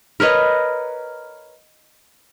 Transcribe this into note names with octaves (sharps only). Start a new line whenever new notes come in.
A#4 B4 C#5 D#5